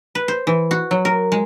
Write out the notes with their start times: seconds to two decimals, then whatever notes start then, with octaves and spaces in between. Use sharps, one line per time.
0.15 B4
0.28 C5
0.47 E3
0.71 F#4
0.91 F#3
1.05 A#4
1.32 G#3